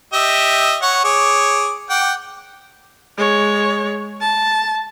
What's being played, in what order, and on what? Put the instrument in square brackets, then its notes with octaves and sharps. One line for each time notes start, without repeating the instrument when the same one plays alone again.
[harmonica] G4 D#5 E5
C#5 F#5 C#6
G#4 C#5 D6
F#5 G5 D6
[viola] G#3 C#5
A5